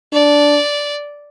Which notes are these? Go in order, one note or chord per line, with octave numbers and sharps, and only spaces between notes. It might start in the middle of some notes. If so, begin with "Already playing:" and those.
D4 D5